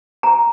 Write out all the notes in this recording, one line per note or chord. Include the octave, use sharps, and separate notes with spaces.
A#5